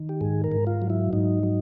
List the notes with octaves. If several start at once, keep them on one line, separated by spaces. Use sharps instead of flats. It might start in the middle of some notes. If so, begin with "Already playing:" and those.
Already playing: D#3
G4
G#2 G#4
A#4
G#2
F4
F#3
E4
G#2 D#4
F#3